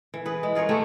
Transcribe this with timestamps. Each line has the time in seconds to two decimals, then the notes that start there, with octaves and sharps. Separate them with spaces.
0.14 E3
0.26 G#4 B4
0.43 G#3
0.55 F4 G#4 A#4 C#5
0.69 A3 E4 G4